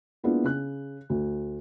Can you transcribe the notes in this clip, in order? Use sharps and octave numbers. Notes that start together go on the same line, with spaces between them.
G#3 A#3 B3 D4 E4 F4
C#3 F#6
D2